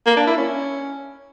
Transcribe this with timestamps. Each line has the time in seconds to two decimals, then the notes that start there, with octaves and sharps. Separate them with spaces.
0.06 A#3
0.17 D4
0.27 E4
0.37 C#4